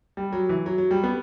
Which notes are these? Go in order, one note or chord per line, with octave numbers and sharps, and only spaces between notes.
G3
F#3
E3
F#3
F#3
G3
B3